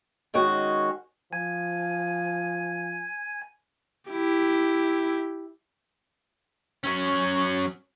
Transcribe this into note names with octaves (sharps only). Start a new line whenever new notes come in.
D#3 G#3 C#4 F#4
F3 G#5
E4 G4
F#3 C#4